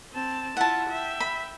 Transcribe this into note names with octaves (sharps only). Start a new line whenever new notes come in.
C4 A5
E4 F4 F#5 A5
E5 G5
B5